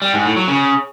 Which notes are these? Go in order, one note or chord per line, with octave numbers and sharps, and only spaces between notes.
G3
G#2
A2
F#3
C#3